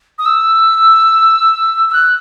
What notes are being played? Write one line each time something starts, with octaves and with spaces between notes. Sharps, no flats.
D#6
E6
E6
E6
F#6